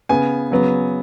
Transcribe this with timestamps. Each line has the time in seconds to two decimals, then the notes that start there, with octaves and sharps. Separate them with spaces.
0.09 C#3 B3 G#5
0.51 C#3 F#3 B3